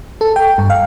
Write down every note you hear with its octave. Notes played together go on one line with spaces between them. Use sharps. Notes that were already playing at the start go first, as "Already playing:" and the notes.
A4
G5
G2
F5